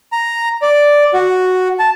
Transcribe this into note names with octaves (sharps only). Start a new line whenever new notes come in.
A#5
D5
F#4
A5